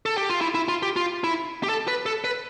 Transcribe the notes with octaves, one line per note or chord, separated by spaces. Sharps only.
A4
G4
F4
E4
E4
F4
G4
F4
E4
G4
A4
B4
A4
B4